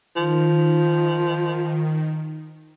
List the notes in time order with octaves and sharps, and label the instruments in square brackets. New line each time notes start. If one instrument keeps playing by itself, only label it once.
[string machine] D#3 [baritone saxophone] F3